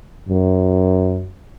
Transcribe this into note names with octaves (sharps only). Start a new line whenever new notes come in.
F#2